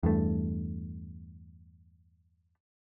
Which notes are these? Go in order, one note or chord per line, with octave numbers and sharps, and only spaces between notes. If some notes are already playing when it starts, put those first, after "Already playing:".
E2 G2 A3